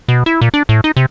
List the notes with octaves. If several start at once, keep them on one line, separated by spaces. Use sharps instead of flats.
B2
E4
A#2
D4
A2
D#4
C3